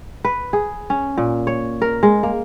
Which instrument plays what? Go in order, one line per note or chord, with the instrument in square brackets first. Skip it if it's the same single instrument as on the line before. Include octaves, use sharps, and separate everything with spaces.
[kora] B4
G#4
C#4
A#2
C#5
A#4
G#3
A#3